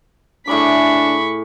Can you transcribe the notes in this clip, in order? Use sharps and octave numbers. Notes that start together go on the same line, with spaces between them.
A2 D4 G#4 B5 C#6 D6